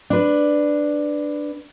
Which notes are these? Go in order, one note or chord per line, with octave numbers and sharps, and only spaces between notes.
D4 B4